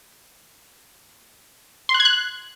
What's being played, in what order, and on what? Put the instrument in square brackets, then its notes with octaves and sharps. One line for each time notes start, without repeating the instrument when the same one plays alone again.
[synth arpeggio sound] C6
F#6
G#6
F#6